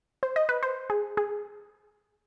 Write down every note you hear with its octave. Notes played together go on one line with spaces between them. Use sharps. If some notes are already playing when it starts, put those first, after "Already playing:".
C5
D#5
B4
C5
G#4
G#4